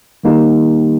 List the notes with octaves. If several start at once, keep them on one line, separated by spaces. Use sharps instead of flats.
D#3 G3 A#3 D#4 G4